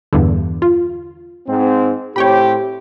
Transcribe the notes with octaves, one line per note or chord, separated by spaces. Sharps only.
E2 G2 D3
F4
G#2 C4
A2 C4 G4 C#5 G5 B5